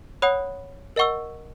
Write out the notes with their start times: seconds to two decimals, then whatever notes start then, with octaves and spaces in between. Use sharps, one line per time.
0.22 C#5 F#5 B5 D#6 F#6
0.96 A#4 D#5 F#5 C#6 E6